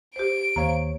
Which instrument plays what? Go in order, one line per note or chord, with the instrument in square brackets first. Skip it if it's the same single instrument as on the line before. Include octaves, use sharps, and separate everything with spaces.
[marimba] G4 C5 [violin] D7
[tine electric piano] D#2 C#5 [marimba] C5 F5 A#5